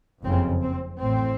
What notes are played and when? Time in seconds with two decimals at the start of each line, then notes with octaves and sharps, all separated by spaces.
0.22 F#1 F2 C#3 C4
0.61 C4
1.00 A1 A2 C4